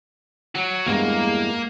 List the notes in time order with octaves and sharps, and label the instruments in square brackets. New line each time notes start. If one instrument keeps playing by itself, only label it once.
[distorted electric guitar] F#3 F#4
[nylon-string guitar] E2 G2 G#3 [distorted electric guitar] A#3